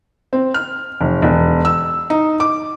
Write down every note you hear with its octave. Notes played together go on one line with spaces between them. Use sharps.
C4
F6
F1
E1
E6
D#4
D6